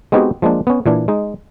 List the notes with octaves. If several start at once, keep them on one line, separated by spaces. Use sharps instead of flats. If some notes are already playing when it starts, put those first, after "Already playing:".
G#3 B3 C4 D#4 F#4 G4
F3 G#3 A#3 D4
B3 C#4
A#2 E3 D4
G#3 D#4